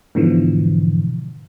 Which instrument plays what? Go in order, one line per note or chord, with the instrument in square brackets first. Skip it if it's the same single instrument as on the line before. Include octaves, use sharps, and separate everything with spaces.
[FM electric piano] G#2 B2 D3 E3 F3